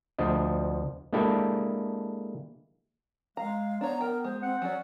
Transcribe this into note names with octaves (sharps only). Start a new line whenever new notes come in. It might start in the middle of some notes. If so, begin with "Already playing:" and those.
D2 F3 D4 D#5
G#3 A#3 D4 E4 G4 A4
G#3 F5 A#5
B3 D4 C#5 A#5
A#4 G5 A#5
G#3 C5
C4 F#5
F#3 C#4 D5